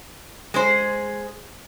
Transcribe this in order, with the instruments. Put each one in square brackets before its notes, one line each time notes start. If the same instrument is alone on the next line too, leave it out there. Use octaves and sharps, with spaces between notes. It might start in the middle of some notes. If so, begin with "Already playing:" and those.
[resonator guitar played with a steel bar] G#3 G#4 C5